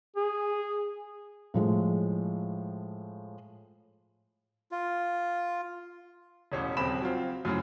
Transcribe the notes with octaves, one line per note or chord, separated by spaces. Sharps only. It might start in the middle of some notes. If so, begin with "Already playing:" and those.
G#4
A2 F3 G#3
F4
E1 A1 C#4
D#1 C#3 C4 B5 E7
F#3 C4 F4
F#2 A2 C#3